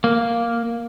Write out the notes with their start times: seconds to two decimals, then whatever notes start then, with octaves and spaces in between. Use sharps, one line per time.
0.04 A#3